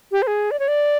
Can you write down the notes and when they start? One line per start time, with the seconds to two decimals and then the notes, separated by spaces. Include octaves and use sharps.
0.12 G4
0.22 C5
0.27 G#4
0.51 D5
0.59 C#5
0.68 D5